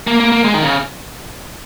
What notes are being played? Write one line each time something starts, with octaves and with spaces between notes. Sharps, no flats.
A#3
A#3
A#3
G#3
D#3
C#3